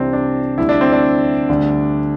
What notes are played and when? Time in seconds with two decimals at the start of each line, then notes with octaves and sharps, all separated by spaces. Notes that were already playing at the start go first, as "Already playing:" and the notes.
Already playing: C2 C3 E3 G3 C4 D4
0.13 D4
0.58 D2 D3 G3 E4
0.69 D4
0.81 C4
0.92 D4
1.49 D2 D3 G3